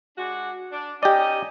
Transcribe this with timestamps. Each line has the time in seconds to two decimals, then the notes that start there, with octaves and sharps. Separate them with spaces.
0.18 G#3 D4 F#4
0.72 D4
1.03 C#4 D#4 G4 D5 D#5